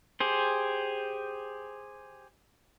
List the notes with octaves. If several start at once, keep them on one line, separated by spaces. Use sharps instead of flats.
G4 G#4 C5